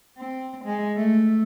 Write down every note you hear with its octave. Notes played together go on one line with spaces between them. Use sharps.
C4
G#3
A3